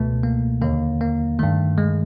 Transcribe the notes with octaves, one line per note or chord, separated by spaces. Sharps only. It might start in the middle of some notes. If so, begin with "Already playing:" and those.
Already playing: C#2 B2 A3
A#3
D#2 D3 A#3
A#3
G2 D#3 A3
G#3